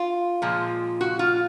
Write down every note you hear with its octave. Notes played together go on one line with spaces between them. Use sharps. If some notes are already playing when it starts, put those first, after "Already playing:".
Already playing: F4
A#2 F3 G#3
F#4
F4